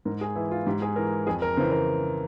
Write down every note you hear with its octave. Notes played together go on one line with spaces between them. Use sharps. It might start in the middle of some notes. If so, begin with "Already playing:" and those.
G#2 A#4
G#4
E3 E4
F4
G#2 G4
G#4
E3 A#4
F2 G#4
A#4
C#3 E3 C5
A#4